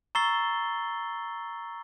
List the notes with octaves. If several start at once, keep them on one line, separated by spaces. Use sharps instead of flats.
A#5 C#6 E6 A6 C7 G7